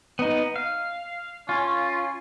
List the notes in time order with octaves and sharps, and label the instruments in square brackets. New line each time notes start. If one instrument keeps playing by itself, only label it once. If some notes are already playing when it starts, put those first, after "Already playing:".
[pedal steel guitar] B3 D#4
F5
[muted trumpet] C#4 [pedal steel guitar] F4